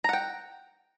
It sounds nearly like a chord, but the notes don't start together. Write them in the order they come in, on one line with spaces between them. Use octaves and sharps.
A#5 F#5 G5